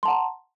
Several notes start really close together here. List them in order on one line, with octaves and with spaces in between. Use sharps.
C6 A5 F#5 A#5